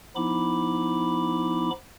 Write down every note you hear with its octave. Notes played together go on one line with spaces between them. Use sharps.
F3 B3 D#4 E4 B5 D6